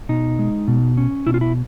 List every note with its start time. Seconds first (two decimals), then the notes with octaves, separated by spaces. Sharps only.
0.09 B2 D#4
0.39 G#3
0.68 B2
0.97 C#4
1.27 B2 E4
1.34 F4
1.41 E4